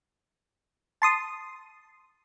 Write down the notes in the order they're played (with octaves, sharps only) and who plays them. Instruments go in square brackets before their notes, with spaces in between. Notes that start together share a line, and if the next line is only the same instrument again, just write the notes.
[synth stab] A5 C6 D#6